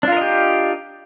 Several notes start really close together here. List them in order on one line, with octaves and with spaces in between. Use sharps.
D4 F4 A#4 D#5 G4